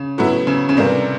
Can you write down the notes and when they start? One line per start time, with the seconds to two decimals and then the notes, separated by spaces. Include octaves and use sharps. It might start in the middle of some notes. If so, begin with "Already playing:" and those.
Already playing: C#3
0.18 A2 F#3 B3 E4
0.47 C#3
0.69 C#3
0.77 A2 C3 E3 G3 A#3 D4